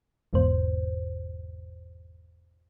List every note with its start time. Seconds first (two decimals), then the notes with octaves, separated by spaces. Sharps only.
0.33 G#1 E2 G#2 B2 C5